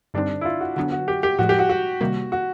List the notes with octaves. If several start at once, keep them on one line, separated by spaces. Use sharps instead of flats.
G2 D3 G3 C4 D4 D#4
E4
F4
F#4
D3 F#3 B3 D4 F#4
F#4
G4
G4
A2 F3 G#3 F#4
G4
F#4
F#4
C3 D#3 G3 A#3
F#4